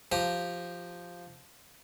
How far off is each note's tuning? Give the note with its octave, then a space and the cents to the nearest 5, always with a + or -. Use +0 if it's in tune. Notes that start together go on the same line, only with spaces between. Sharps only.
F3 +0 G4 +0 A#5 +0